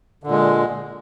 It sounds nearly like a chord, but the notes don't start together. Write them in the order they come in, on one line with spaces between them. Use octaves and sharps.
D3 A#2 G#3